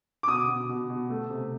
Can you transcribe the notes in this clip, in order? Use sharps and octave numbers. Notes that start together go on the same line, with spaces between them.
D6
B2 D#6
B2
B2
B2
A3
C3